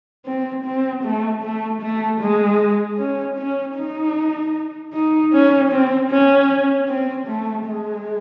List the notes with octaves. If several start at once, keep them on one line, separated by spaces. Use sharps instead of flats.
C4
C4
A3
A3
A3
G#3
C#4
C#4
D#4
D#4
C#4
C4
C#4
C4
A3
G#3